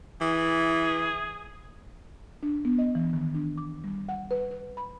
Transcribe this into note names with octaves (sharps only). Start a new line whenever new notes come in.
E3 G#4
D4
B3
D#5
E3
D#3
D4
D6
G3
F#5
B4
B4
B5